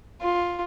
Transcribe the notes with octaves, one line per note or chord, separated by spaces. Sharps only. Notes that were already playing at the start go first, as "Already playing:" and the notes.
F4